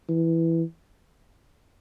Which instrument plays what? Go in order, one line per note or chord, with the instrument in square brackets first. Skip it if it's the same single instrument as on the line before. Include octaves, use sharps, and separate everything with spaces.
[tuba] E3